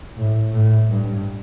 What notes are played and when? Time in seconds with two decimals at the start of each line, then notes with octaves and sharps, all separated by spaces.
0.17 A2
0.53 A2
0.89 G2